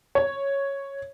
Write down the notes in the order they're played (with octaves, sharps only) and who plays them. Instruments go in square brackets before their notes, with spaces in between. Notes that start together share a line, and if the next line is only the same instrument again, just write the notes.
[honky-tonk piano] C#5